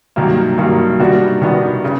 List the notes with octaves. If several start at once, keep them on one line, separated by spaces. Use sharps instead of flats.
G2 D#3 F#3 A#3
G2 D#3 F#3 A#3
D#3 G3 B3 D4 F#4
D#3 G3 B3 D4 F#4
C#3